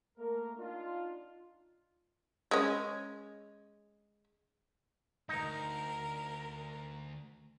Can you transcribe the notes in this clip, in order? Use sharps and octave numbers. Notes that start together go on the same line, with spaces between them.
A3 A#3 A#4
D4 D#4 F4
G#3 C#4
D2 G2 D#4 A#4